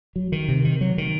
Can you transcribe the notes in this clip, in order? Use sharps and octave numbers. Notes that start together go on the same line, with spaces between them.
F#3
D#3
C3
D#3
F#3
D#3